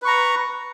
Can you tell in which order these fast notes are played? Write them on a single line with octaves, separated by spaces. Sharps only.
B4 C#6 A#5